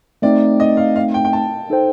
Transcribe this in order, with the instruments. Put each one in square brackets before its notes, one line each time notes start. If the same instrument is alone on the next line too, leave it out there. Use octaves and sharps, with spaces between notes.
[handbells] A3 C4 D#4 [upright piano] D5
[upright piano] D#5
F5
F5
G5
G5
A5
[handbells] D#4 A4 C5 G5